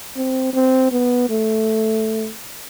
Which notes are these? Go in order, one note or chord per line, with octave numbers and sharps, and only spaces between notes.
C4
C4
B3
A3